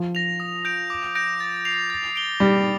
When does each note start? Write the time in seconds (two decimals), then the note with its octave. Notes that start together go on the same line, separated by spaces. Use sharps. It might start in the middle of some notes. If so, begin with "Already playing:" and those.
Already playing: F3
0.15 A#6 F7
0.40 D#6
0.65 G6 D7 F7
0.90 D6
1.15 G6 A#6 D7
1.40 A6
1.65 C7 F7
1.90 A6
2.16 D7 G7
2.40 G3 D6